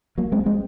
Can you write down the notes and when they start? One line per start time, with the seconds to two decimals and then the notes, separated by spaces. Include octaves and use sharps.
0.18 F#3 A#3
0.32 G#3 C4
0.46 G#3 C4